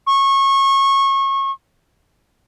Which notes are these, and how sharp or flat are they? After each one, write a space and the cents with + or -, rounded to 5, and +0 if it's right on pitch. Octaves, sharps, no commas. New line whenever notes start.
C#6 -25